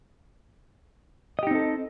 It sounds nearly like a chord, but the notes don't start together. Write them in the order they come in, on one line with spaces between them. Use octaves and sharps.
D#5 G4 D#4 C4 A4